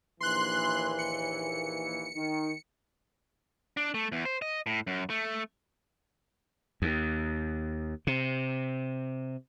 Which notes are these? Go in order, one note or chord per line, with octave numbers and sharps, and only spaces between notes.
A#1 D#2 E3 C6 F#6
C#7
D#3
D4
A3
E2
C5
D#5
A2
F#2
A3
D#2
C3